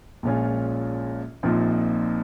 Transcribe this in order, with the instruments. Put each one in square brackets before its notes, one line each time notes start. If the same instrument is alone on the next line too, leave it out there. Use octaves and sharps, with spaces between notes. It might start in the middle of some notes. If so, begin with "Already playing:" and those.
[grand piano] A#1 A#2 G#3 C#4 F4
A#1 A#2 F3 C4 D#4